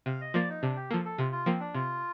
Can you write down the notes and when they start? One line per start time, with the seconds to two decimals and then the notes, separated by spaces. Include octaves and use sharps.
0.06 C3 F5
0.21 D#5
0.34 F3 A#3 D5
0.49 D#4
0.62 C3 D4
0.76 G4
0.91 F3 A#3 A4
1.05 A4
1.18 C3 F4
1.32 F4
1.46 F3 A#3 C4
1.60 D4
1.74 C3 F4